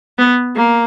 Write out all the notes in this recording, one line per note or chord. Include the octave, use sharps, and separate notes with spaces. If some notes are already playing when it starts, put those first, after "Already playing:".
B3
A#3